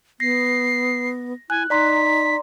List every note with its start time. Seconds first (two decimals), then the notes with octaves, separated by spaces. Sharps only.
0.20 B3 A#6 C7
1.50 E4 G#5 F#6
1.70 D#4 D5 A#5 C6 B6